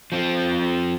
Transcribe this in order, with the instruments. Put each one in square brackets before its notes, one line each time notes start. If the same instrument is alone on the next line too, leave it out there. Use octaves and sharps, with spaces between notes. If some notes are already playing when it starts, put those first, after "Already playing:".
[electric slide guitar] F3 C4